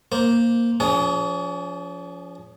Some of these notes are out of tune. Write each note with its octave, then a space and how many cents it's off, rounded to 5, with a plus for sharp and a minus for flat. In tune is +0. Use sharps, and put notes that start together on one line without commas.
A#3 +0 C5 +0
F3 +0 C#4 +40 G#4 +0